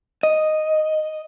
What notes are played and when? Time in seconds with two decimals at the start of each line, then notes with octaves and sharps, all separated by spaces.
0.23 D#5